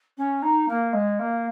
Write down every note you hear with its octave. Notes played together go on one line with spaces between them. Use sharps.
C#4
D#4
A#3
G#3
A#3